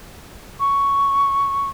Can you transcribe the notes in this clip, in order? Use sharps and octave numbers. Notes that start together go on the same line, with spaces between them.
C#6